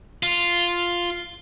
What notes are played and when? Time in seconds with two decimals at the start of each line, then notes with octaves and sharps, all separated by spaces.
0.23 F4